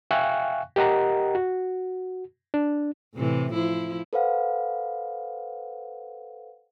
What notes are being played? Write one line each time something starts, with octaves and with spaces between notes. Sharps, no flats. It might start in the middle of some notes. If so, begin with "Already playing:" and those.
E5 F5 G5 G#5 C#6 F#6
G4 A#4 D#5 F#5 G5 A#5
F#4
D4
A2 C3 E3
F3 E4
A4 B4 C5 F5 F#5